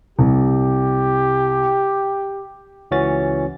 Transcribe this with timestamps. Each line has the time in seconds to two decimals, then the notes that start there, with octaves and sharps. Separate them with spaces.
0.19 C2 G4
2.91 C#2 E3 C#4 F#4 A6